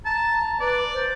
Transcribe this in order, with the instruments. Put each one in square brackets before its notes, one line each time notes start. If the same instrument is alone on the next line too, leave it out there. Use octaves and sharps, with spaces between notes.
[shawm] A5 [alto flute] A#5
[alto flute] B4 [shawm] D5
[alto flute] C5